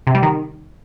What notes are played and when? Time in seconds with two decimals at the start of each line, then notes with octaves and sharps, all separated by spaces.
0.07 C3
0.15 G3
0.23 D#3